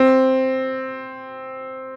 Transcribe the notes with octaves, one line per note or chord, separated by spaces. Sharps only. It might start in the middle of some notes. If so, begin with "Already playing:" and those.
Already playing: C4